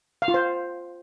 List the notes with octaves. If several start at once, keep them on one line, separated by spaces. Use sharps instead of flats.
F5
F4
C5